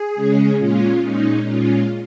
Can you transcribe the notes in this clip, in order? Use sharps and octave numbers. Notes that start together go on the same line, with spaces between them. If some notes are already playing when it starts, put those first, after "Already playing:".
Already playing: G#4
C#3 G#3 C#4
A#2 G#3 C#4 F4
A#2 G#3 C#4 D#4
A#2 G#3 C#4 F4